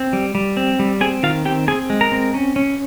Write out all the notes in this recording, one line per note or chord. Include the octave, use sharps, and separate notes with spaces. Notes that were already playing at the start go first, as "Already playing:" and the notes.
Already playing: C4
G3
G3
C4
G3
C4 G#4 G#5
D#3 F4 F5
C4 G4 G5
C4 G#4 G#5
G#3
A#4 A#5
C4
C#4
C#4